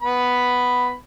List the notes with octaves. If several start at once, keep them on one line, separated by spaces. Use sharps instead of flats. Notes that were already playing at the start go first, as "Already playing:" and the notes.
B3 B5